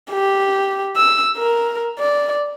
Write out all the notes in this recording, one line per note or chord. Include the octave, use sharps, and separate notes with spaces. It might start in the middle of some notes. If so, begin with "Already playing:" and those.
G4
E6
A#4
D5